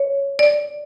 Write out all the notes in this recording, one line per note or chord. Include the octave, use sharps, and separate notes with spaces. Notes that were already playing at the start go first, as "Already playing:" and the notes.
Already playing: C#5
D5